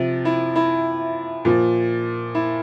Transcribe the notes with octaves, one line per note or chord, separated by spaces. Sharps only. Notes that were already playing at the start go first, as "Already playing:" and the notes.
Already playing: C3 F3
E4
E4
A#2 F3
E4